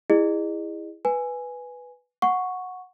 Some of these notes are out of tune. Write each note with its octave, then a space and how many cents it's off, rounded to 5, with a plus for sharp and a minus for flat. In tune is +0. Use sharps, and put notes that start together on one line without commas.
E4 +0 G#4 -25 D#5 -40
B4 +0 G#5 +0
F#5 -15 C#6 +0